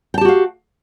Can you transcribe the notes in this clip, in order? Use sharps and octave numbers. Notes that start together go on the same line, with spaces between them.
F#4 G4 F5 G5 A5